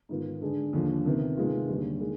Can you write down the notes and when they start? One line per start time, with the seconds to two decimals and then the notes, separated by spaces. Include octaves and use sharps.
0.09 G#2 D#3 B3 F4
0.41 D3 G#3 D4 G#4
0.73 D#2 D3 F3
1.05 C3 D#3 B3
1.37 C3 D#3 G#3 B3 F4
1.68 D#2 D3 G3
2.00 D#3 G#3